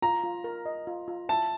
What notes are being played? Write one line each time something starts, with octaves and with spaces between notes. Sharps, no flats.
F4 A#5
F4
A#4
D#5
F4
F4
E5 A5